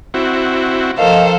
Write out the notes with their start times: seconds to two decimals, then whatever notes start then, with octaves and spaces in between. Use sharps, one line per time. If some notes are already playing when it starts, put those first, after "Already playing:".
0.14 C4 E4 F#4
0.97 D#3 F3 A4 C5 F5